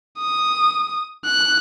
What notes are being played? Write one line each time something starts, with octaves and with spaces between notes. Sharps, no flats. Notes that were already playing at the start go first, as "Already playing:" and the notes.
D#6
F#6